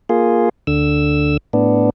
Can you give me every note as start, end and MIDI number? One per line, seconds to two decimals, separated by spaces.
0.09 0.49 58
0.09 0.49 65
0.09 0.49 68
0.67 1.37 38
0.67 1.37 50
0.67 1.37 88
1.53 1.90 45
1.53 1.90 59
1.53 1.90 62